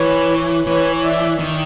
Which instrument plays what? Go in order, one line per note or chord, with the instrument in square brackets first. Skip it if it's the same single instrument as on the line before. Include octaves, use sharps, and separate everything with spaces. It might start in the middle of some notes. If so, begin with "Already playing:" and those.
Already playing: [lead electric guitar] E3 [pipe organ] B4 C#5
[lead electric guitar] E3 [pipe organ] B4 C#5
[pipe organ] D5 E5
[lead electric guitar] D#3